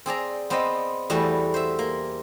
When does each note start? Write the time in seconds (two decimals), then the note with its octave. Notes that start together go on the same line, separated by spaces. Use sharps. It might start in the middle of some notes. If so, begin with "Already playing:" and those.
0.06 C4 G#4 D5 A#5
0.50 B3 C4 C5 D5 D#5
1.10 E2 G3 A3 F#4 B4 A5
1.54 C5 E5
1.79 A#3